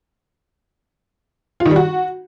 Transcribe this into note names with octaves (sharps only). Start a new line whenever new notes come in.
F4
D#3
G3
F#4